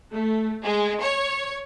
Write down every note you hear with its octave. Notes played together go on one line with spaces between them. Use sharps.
A3
G#3
C#5